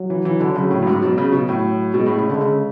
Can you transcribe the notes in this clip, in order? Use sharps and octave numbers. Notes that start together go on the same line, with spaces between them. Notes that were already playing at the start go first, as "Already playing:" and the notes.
Already playing: F#3
E3
E3
D3
C#3 F#3
A2
F#2
G#2
B2 F#3
C#3
B2
A2
B2 G#3
A2
C#3
D3
C#3